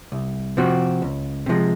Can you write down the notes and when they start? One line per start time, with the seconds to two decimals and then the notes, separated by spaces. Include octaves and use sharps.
0.12 C2
0.57 C3 F3 C4 F#4
1.02 C#2
1.46 C3 F3 G#3